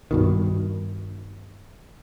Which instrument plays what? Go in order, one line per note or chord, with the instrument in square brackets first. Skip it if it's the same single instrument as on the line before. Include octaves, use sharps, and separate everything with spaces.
[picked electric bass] G2 B2 D#3